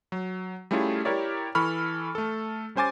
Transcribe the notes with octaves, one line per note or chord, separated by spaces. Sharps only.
F#3
G3 A3 C#4 E4 F4 G#4
E4 G4 A#4 C#5 D5 E5
E3 A4 B5 C#6 F6
A3 A4
G3 C#4 C5 G#5 D6 A6